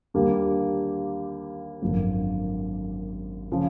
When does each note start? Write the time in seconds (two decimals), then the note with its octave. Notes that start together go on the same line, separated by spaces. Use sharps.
0.14 D#2 D3 G3 A#3 D4
1.82 G#1 F#2 D3 F3 A#3
3.52 C#3 F3